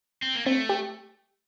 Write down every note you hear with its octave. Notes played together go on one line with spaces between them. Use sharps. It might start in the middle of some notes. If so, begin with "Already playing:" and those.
C4
A#3
A3 C4
G4